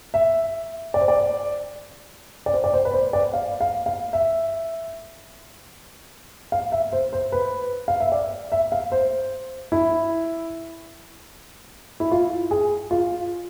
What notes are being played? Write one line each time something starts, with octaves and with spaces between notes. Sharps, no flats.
E5
D5
C5
D5
D5
C5
D5
C5
B4
C5
D5
F5
F5
F5
E5
F5
E5
C5
C5
B4
F5
E5
D5
E5
F5
C5
E4
E4
F4
G#4
F4